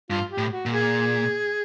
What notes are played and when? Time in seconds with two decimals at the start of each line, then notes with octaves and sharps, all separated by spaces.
0.10 G2 F4
0.31 G4
0.38 A2
0.51 F#4
0.66 A#2
0.73 G#4